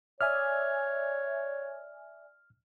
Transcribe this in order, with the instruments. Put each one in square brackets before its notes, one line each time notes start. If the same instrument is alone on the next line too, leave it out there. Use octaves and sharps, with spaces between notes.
[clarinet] C#5 [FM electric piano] D5 E5 G#5 [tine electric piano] F6